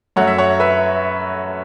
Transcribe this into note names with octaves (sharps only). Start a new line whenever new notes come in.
F#2 F#3 A3 C#5 F#5
E5
C#5 F#5
B4 E5